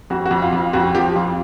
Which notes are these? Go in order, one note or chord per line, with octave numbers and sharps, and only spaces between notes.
F2 F#4
F#4
F2
F4
F2 F4
F2 F#4
F3 G4
F2 F4